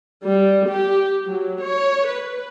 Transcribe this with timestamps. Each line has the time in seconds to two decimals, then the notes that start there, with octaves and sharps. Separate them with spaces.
0.24 G3
0.68 G4
1.26 F#3
1.63 C#5
2.07 B4